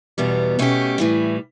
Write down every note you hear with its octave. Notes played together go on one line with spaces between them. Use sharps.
E2 B2 G3 B3
B2 A3 C#4 G4
A2 E3 G3